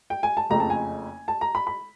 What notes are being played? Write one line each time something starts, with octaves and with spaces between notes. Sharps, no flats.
G5
G#5
A5
F#1 F2 C#3 F3 A3 A#5
A5
G#5
A5
A#5
B5
B5